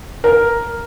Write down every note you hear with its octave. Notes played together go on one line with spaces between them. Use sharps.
A#4